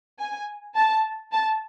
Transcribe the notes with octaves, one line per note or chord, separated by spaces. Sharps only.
G#5
A5
A5